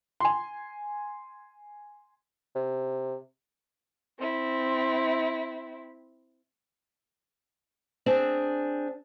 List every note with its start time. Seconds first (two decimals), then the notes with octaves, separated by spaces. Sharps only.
0.20 G#5 C6
2.55 C3
4.19 C4 E4
8.06 C4 D4 G#4